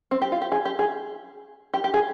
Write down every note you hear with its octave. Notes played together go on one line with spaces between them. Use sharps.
C4
G4
F4
G4
G#4
G4
G#4
G4
G4
G#4